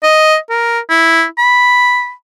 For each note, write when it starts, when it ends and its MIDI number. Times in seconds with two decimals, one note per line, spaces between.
0.03 0.37 75
0.50 0.79 70
0.90 1.24 64
1.38 2.11 83